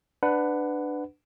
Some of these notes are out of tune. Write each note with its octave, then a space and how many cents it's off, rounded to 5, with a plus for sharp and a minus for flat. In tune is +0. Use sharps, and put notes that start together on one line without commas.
D4 +15 B4 +15 F#5 +0